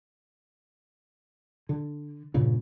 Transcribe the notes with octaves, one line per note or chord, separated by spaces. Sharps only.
D3
G2 A#2 C#3